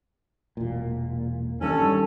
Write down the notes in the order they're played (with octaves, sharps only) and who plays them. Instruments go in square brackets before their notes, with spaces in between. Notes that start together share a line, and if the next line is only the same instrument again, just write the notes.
[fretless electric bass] E1 A#2
[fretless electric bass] G2 D#3 [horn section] C#4 A4